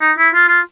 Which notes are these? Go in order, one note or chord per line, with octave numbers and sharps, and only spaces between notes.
D#4
E4
F4
F4